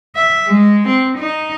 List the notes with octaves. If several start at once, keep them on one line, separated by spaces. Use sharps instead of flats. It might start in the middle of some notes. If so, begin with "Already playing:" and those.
E5
G#3
C4
D#4